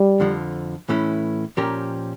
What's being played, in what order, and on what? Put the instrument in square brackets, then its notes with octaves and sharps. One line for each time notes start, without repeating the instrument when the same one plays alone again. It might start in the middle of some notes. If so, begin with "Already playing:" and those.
Already playing: [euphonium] G3
[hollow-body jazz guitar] F2 D3 F3
A2 E3 A3 C#4 E4
A#2 F3 C#4 G4 A#4